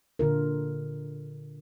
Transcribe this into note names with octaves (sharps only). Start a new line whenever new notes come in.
A#2 D3 F4 A#4